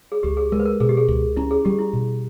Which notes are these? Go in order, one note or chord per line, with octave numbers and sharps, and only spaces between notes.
G#4
C#2 G4
G#4
G#3 A#4
B4
A#4
B2 G#4
G4
G#4
C#2
C#4 E4
G#4
G3 G4
E4
B2